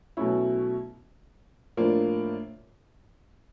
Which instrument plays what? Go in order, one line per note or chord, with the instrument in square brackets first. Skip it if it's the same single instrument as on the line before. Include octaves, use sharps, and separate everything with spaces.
[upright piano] B2 F#3 A3 C#4 E4
A2 F3 A#3 D4 F4